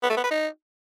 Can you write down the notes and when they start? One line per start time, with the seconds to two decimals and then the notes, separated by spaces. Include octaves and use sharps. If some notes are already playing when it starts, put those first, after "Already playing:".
0.03 B3
0.10 A3
0.17 B3
0.24 B4
0.31 D#4